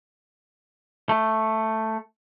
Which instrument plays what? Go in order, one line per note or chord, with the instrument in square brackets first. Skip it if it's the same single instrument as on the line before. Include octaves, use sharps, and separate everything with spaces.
[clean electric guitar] A3